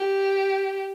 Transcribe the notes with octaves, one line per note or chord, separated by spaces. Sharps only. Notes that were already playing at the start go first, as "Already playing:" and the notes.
Already playing: G4